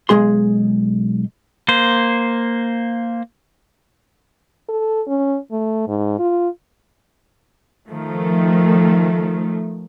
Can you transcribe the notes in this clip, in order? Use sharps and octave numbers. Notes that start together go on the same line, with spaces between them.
B1 B2 G#3 G#4 C6
A#3 C5
A4
C#4
A3
G#2
F4
D#3 F3 A3